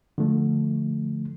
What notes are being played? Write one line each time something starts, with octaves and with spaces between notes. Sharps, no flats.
D3 F3 A3